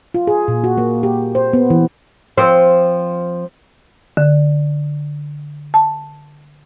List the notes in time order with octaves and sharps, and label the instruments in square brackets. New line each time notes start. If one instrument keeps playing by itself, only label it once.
[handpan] F4
G#4
A#2
F#4
A#3
G4
C5
B3
E3
[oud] F3 C4
[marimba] D3
A5